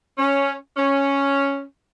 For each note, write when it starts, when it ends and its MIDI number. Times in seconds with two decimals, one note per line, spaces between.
0.18 0.54 61
0.77 1.62 61